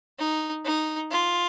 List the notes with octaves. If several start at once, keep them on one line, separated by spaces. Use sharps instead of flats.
D#4
D#4
F4